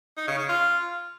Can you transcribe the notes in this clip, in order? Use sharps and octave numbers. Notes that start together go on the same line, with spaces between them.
D#4
C#3
C#3
F4